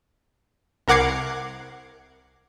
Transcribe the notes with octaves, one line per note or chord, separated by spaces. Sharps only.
C2 A#4 F#5 D6 G#6 C7